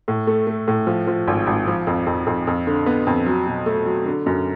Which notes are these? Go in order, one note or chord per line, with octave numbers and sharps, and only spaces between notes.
A2
A3
A3
A2
F3
F3
G#1
G#1
F3
F2
F2
F2
F2
D3
B3
F2
F#3
B2
A3
F#3
D3
F#2